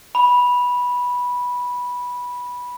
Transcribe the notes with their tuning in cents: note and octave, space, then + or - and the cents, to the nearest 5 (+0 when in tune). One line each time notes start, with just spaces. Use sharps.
B5 -10